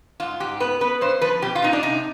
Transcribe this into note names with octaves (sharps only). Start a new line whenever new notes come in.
G#2 F4
G#2 G4
B3 B4
B3 B4
G2 C5
F3 B4
B2 G4
F4
B2 D#4
D4
C3 D#4